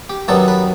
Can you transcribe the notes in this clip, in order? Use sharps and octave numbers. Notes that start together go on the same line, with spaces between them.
G4
F#2 D#3 G3 B3 A4
B4